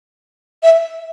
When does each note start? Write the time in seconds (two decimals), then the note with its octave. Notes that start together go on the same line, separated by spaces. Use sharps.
0.63 E5